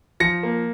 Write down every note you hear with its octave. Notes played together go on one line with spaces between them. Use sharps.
F3 A#6 C#7
A#3